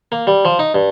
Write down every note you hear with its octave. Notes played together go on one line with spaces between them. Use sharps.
A#3
G3
F3
D#4
G2